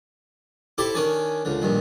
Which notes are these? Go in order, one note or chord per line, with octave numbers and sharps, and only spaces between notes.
E4 G4 A4 C5 D6
D#3 C#4 D4 D5 G#5
C#2 D3
A#1 G2 D#3